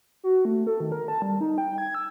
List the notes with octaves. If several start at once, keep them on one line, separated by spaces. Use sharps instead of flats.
F#4
A3
A4
D#3
A#4
A5
G3
D#4
G5
G#6
E6